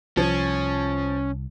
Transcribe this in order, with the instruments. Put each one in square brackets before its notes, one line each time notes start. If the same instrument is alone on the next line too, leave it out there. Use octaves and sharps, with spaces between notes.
[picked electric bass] C2 [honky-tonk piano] F3 [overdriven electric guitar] C#4